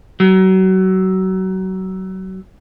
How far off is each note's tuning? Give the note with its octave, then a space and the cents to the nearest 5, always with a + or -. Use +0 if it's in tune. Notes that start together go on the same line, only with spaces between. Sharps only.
F#3 +30